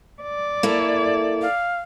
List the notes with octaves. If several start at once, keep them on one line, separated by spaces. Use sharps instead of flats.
D5
A#3 E4 A4
F5